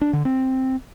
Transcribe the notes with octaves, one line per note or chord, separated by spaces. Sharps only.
D4
D3
C4